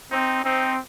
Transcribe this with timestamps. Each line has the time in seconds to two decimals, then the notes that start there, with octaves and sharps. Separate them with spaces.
0.11 C4 D#4
0.44 C4 D#4